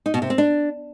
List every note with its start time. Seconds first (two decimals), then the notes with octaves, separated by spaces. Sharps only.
0.06 D#4
0.14 B2
0.22 C3
0.30 C4
0.38 D4